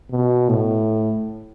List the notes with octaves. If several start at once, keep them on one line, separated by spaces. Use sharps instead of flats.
B2
A2